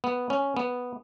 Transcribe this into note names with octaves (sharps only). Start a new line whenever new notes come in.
B3
C#4
B3